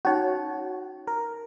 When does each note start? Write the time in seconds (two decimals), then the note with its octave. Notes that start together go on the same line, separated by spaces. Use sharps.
0.05 C#4 D#4 F#4 C#5
1.07 A#4